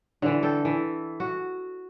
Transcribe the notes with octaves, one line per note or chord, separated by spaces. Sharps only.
D3 E3
A4 G5
E3
F#4